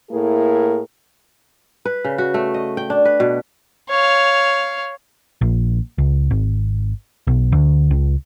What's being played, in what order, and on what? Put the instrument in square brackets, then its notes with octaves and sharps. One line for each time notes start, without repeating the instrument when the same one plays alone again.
[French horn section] A2 A#3 E4 G#4 A#4
[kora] B4
C#3
F#4
A3
D#5
G5
D4
B4
B2
[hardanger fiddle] C#5 F5
[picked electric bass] A#1
C#2
G#1
B1
D2
C#2